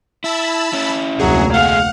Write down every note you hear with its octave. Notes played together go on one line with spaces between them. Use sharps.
E4 A5 B5 E6
C#4 E4
F1 D2 F#3 A#3 G#4
A3 G#4 F5 F#5